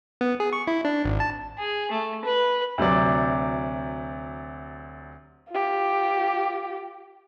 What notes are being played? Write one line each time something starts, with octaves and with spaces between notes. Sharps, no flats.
B3
G#4
C#6
E4
D4
G#1
A5
G#4
A3
B4
D2 C3 F#3 D5
F4 G4